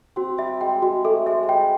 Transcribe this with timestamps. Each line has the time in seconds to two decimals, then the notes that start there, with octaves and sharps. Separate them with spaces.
0.16 C4 F#4
0.38 G3 E5
0.61 G#3 G5
0.82 G#3 F#4
1.04 A3 A4
1.26 G#3 E5
1.43 G#3
1.49 G3 G5